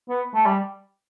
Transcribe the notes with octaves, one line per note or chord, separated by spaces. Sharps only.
B3
A3
G3